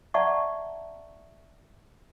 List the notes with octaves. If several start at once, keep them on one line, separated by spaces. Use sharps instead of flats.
D5 E5 F#5 A5 A#5 C#6